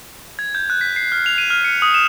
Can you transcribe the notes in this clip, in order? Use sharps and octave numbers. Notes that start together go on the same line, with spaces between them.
G#6
G6
F#6
B6
C7
F6
F7
D#7
F6
C#7
D#6
E7